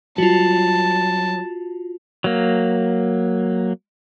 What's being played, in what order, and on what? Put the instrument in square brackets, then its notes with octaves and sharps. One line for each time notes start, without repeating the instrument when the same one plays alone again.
[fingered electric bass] F#3 G3 [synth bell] F4 F#4 [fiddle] A5
[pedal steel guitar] F#3 A#3